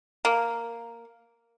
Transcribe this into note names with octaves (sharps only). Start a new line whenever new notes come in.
A#3